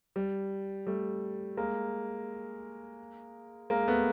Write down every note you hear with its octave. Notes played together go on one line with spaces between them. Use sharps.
G3
G3 A3
G#3 A#3
G#3 A#3
A3 B3